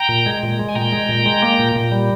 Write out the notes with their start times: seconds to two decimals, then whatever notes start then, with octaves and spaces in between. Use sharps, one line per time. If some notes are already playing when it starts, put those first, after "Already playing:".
Already playing: G5 A#5
0.09 A#2
0.26 G#3
0.43 A#2
0.59 G#3
0.69 G#5
0.75 A#2 G5 A#5
0.92 G#3
1.09 A#2
1.26 G#3
1.42 A#3
1.59 A#2
1.76 A#2
1.92 G3